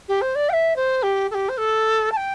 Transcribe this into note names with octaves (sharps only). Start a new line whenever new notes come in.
G4
C5
D5
G5
E5
C5
G4
A4
G4
C5
A4
A5
G5